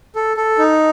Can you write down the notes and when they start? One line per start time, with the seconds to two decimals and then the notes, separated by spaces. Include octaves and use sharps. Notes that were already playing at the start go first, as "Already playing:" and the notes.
0.16 A4
0.37 A4
0.58 D#4